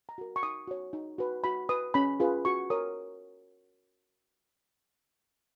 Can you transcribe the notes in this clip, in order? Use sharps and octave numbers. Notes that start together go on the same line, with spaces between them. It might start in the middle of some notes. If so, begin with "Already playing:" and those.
A#5
F#4 A#4
C#6
D#4 D#6
F#4 C#5
D#4
F#4 B4
F#4 B5
B4 D#6
C#4 B5
F4 G#4 B4
F#4 C#6
A#4 C#5 D#6